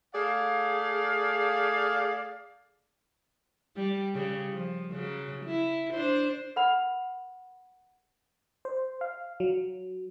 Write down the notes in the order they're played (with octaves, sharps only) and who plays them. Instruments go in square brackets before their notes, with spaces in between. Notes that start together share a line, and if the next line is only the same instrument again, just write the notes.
[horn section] A3 G#4 D5 F5
[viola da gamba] G3
C#3 G3
F3
C#3 F#3
E4
D4 C5
[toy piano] A#4 B4 F#5 B5
[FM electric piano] C5
F5
F#3